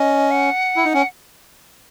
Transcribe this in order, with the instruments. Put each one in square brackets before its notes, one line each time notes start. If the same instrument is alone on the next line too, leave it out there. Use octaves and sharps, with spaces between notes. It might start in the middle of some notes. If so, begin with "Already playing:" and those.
Already playing: [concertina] C#4 [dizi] D#5
[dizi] F#5
[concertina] E4
D#4
C#4